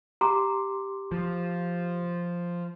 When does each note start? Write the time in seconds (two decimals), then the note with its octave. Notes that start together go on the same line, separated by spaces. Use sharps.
0.21 G4 A#5 C6 D6
1.12 F3